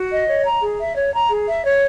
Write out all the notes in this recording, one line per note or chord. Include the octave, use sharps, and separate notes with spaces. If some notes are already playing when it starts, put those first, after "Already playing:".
Already playing: F#4
D#5
C#5
A#5
G#4
E5
C#5
A#5
G#4
E5
C#5